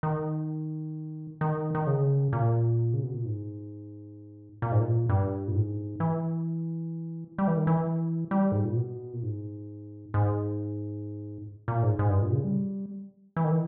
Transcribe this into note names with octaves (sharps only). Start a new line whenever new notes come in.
D#3
D#3
D#3
C#3
A#2
C#3
B2
A#2
G#2
A#2
G#2
A#2
G2
A#2
G#2
E3
G3
E3
D#3
E3
G3
G#2
A#2
B2
A#2
G#2
G#2
A#2
G#2
G#2
G2
A#2
C#3
G3
E3
D#3
E3